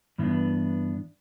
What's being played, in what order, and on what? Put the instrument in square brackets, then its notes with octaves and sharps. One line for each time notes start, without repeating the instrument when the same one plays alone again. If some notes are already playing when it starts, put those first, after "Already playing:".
[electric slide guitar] G2 E3 B3 D4